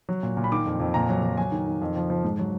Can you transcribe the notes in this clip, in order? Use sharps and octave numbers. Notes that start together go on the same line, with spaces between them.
F#3
A#2
A#2
B5
D#3 D6
F2
F2
A#2 A#5
F#3
F#3
F#3 G#5
D#3
D#3
F2
F3
F3
G#2
F#3